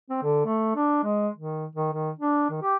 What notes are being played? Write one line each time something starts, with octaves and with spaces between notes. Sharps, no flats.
C4
D3
A3
D4
G#3
D#3
D#3
D#3
D4
D#3
G4